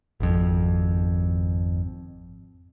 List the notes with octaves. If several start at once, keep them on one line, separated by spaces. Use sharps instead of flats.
G#1 F2